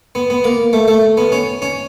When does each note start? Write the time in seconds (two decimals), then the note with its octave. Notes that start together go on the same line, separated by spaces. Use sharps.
0.15 B3
0.30 B3
0.44 A#3
0.73 A3
0.88 A3
1.17 B3
1.32 C#4
1.62 C#4